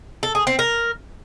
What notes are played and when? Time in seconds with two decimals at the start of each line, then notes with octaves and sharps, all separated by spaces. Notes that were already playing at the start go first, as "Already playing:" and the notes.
0.23 A4
0.35 G#4
0.47 C4
0.59 A#4